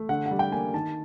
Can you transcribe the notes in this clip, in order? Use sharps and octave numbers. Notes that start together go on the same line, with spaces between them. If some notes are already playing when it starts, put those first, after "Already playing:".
Already playing: A3
D3 F#5
F#5
G3
G5
A#3 G#5
D#3 A5